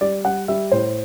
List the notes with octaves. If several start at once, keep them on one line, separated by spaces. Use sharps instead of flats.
G3 D5
G3 F#5
G3 E5
A2 C5